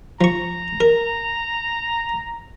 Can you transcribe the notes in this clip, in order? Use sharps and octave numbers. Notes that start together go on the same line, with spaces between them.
F3 A#5 C#6
A#4